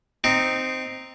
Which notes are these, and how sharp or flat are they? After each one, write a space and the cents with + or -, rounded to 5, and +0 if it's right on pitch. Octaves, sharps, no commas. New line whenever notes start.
C4 -5 D#4 -5